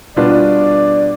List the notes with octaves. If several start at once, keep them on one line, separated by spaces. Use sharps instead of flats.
B2 G3 D4 F4 B4 D5